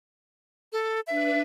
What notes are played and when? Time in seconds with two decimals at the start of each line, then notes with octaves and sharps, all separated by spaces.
0.73 A4
1.07 D4 B4 E5